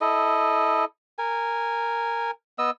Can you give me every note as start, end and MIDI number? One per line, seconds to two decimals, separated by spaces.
0.01 0.85 64
0.01 0.85 69
0.01 0.85 75
1.18 2.31 70
1.18 2.31 80
2.59 2.70 59
2.59 2.70 75
2.59 2.70 88